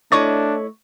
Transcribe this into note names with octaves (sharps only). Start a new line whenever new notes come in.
A3 D4 E4 C#5 D#5 C#6 D6 A6